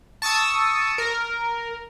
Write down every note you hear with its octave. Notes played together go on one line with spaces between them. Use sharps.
A5 C#6 D#6 E6
A#4